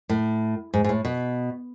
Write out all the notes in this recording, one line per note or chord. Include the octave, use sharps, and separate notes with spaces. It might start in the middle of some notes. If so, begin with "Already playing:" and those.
A2
G#2
G#2
A2
B2